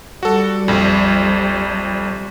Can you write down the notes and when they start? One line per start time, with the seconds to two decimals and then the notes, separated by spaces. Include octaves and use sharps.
0.23 G3 F#4 A4
0.68 A#1 F2